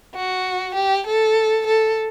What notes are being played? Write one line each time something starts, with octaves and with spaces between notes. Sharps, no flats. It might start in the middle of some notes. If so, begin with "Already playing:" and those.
F#4
G4
A4
A4